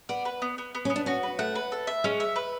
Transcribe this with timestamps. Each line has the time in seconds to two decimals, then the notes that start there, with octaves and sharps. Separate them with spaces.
0.09 B3 D5
0.25 B4
0.42 B3
0.58 B3
0.75 B3
0.85 C#4
0.90 B3
0.96 D4
1.06 C#4 F#4
1.23 B4
1.39 A3 F#5
1.55 B4
1.72 A4
1.87 E5
2.04 G#3 C#4
2.20 E5
2.36 B4